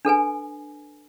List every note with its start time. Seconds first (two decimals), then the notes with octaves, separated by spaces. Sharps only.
0.05 D4 A4 B4 G#5